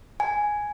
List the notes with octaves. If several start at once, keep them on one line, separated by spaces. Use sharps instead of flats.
G#5